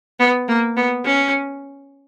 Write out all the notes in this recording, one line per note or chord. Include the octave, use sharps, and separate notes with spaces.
B3
A#3
B3
C#4